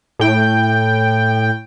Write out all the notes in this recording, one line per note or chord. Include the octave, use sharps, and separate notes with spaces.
A2 G5